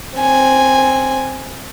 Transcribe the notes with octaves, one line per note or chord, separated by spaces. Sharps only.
C4 G#5